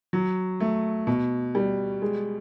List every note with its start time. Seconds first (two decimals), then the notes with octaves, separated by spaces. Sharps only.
0.13 F#3
0.60 A3
1.07 B2
1.55 G3
2.02 G#3